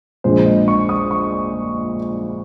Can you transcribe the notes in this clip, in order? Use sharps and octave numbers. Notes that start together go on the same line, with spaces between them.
A#1 A#2 G#3 C5
D#5
C#6
D#6
C#6